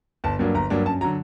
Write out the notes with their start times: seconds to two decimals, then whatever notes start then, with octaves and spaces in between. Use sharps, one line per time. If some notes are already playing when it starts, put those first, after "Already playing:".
0.24 G1 A5
0.39 G2 F#3 A#3 D4
0.55 G1 A#5
0.70 G2 F#3 A#3 D4
0.86 F#2 A5
1.01 F#3 A#5
1.04 D3